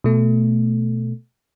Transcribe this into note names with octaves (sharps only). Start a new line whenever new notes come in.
B2 A3